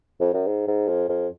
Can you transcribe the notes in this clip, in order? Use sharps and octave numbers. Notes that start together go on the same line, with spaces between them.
F2
F#2
G#2
G#2
F2
F2